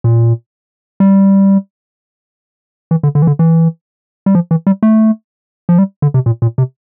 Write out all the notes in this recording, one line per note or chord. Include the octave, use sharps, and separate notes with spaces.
A#2
G3
E3
D3
D3
E3
D3
E3
G3
F3
E3
G3
A3
F3
G3
D3
C3
A#2
A#2
C3